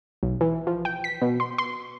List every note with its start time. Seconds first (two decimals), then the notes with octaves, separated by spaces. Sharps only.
0.23 B1
0.41 E3
0.67 F3
0.85 G5
1.04 B6
1.22 B2
1.40 C6
1.58 C6